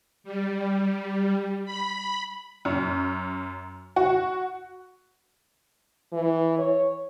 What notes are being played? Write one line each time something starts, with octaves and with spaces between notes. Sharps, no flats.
G3
B5
F#2
F#4
E3
C#5